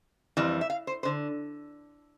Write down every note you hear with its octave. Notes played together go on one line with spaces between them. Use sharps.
F2 E3 G3
E5
F5
C5
D3 C5